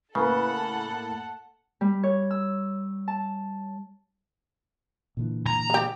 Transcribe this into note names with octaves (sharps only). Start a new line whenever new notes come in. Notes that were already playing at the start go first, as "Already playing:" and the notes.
A2 C#3 A#3 A4 B4 F#5 B5
A5
G3
C#5
E6
A5
A#2 D3 E3
A#5
G#3 G4